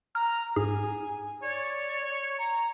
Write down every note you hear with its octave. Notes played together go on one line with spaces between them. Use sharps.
A#5 F6
G#2 G#4 G#5
C#5 D5
A#5